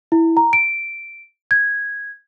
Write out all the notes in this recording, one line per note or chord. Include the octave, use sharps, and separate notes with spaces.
E4
A#5
D7
G#6